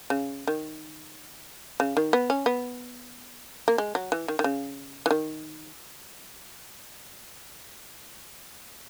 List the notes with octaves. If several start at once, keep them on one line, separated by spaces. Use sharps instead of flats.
C#3
D#3
C#3
D#3
B3
C#4
B3
A#3
G#3
F#3
E3
D#3
D#3
C#3
E3
D#3